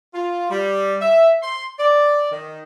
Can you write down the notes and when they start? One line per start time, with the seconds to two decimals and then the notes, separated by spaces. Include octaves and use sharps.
0.14 F4
0.50 G3
1.01 E5
1.43 C6
1.79 D5
2.32 D#3